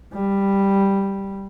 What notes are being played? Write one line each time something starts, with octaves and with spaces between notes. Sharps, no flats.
G3